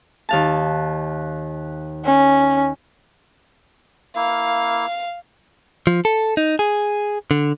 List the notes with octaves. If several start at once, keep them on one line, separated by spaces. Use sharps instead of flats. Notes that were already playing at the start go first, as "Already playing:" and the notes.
D#2 F5 A5
C#4
A#3 E4 F5
F3
A4
D#4
G#4
D3